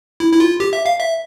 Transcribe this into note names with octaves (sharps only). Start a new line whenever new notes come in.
E4
E4
F4
G4
E5
F5
E5